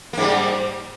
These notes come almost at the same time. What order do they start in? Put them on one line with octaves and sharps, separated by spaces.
A#3 G#2 G3